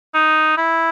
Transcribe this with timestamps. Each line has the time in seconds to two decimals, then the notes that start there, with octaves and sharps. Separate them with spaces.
0.14 D#4
0.58 E4